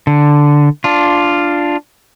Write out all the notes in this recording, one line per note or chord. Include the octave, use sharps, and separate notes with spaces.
D3
D4 F4